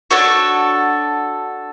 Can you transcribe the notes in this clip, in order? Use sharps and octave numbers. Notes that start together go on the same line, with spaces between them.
D4 F#4 A4 C#5